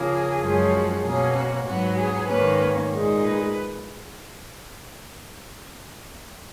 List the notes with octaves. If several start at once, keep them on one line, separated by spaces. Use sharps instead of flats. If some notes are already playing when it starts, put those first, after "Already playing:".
Already playing: C#3 F3 A#3 G#4
F#2 F3 G#3 C#4
F#4
B2 A#3 C#4 G#4
F#4
G#2 F#3 B3 F#4
G#4
G#2 D#3 A#3 C#4 B4
A#2 G#3 D#4
B4